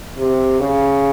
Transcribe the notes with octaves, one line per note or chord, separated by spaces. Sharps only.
C3
C#3